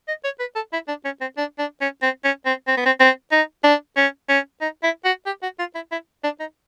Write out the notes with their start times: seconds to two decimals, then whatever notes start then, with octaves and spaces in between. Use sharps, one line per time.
0.08 D#5
0.24 C#5
0.40 B4
0.56 A4
0.73 E4
0.88 D4
1.05 C#4
1.21 C4
1.38 D4
1.59 D4
1.81 C#4
2.03 C4
2.24 C#4
2.46 C4
2.67 C4
2.77 B3
2.86 C4
3.00 C4
3.32 D#4
3.64 D4
3.97 C#4
4.29 C#4
4.61 D#4
4.83 E4
5.05 F#4
5.26 G4
5.43 F#4
5.59 F4
5.75 E4
5.92 E4
6.24 D4
6.40 D#4